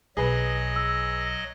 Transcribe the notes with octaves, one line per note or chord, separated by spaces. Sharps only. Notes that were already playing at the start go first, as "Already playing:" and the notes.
B1 F#3 G#4 B4 D#5
E6